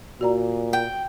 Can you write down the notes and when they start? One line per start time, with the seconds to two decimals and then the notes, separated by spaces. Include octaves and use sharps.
0.21 A#2 F#4 D5 A#5
0.73 G5